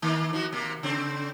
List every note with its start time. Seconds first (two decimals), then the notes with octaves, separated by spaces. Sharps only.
0.02 D#3 A#3
0.33 F3 F#4
0.52 C3 A#3
0.83 C#3 C4